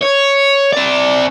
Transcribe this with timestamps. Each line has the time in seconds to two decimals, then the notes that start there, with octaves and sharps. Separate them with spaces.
0.03 C#5
0.73 C4 D5